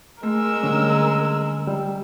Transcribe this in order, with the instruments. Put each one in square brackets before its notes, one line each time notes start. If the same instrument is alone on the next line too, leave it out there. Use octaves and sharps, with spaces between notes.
[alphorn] G#3 [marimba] A3 [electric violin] A#4 E6
[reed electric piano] D3 G3 C#4
G3